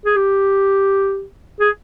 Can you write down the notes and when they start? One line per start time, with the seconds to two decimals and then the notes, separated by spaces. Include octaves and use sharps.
0.06 G#4
0.16 G4
1.60 G#4